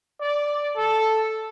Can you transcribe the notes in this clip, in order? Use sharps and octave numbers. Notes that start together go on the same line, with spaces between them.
D5
A4